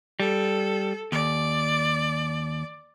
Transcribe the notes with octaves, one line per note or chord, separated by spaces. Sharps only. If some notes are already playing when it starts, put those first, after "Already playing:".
G3 A4
D#2 D5